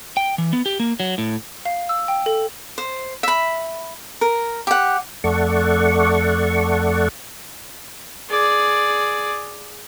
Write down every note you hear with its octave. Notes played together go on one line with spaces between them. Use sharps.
G5
E3
B3
G4
A#3
F#3
A2
F5
E6
G5
A4
C5
E5 B5
A#4
G4 F#5
F2 A3 A4 D5 F#5 C#6
G#4 D5